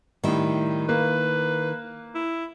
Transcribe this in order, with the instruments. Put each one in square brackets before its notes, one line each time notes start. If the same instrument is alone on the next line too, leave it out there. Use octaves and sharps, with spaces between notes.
[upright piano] A2 G3 [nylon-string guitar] D#3 E4
[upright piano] A#3 [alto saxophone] B4
[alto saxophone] E4